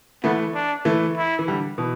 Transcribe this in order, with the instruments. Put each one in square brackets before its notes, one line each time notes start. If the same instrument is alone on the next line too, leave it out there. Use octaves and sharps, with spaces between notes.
[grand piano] E3 A3 [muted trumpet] B3
[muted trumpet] D4
[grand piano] E3 A3
[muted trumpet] E4
[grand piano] E3
D3 G3
B2 E3